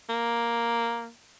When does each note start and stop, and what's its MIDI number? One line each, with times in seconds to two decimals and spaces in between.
0.09 1.10 58